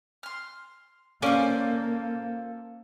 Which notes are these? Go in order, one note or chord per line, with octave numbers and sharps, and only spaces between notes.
C6 F6
A#3 C#4 F4 A4 C5 D5